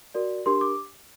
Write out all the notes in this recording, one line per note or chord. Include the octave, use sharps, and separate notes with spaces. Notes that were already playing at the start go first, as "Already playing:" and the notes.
F#4 A#4 D5
D4 G4 A#4 C6
D6